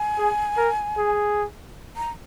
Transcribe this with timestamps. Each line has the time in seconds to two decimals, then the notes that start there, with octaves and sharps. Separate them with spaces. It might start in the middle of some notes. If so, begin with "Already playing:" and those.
Already playing: G#5
0.18 G#4
0.57 A#4
0.97 G#4
1.97 A#5